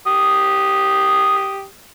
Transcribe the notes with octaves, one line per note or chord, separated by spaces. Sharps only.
G4 D#6